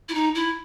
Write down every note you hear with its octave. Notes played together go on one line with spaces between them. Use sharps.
E4
D#4
E4